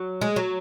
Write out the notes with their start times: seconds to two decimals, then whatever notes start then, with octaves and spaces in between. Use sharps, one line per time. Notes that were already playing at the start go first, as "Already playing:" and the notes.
Already playing: F#3
0.21 G#3
0.36 F#3